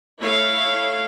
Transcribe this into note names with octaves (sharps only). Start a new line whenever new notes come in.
A3 E4 A4 C#5 F5